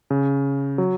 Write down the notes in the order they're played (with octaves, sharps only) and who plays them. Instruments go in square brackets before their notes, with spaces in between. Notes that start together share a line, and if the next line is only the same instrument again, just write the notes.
[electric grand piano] C#3
F#3